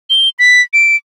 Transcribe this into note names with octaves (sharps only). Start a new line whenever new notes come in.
G7
B6
D7